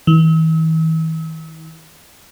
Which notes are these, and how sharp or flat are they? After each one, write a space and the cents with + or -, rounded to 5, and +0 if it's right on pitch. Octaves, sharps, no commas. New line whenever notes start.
E3 -45